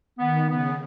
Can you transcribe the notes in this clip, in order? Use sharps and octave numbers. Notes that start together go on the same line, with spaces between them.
D#3 B3
C#3 B3